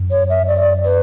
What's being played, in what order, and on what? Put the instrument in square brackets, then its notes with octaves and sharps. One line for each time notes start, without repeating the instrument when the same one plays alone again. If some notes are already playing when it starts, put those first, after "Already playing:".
Already playing: [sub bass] F#2
[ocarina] C#5
E5
D5
B4